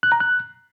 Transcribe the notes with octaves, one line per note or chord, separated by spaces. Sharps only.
F#6
A#5
F#6